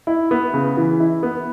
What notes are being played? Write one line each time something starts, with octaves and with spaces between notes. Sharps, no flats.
E4
B3
C#3
E3
E4
B3